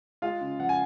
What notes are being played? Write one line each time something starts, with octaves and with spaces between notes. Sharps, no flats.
G#3 F4 F5
C#3
F3 F#5
G#5